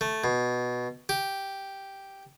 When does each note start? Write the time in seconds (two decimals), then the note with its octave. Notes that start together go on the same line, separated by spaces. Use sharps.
0.01 A3
0.24 B2
1.09 G4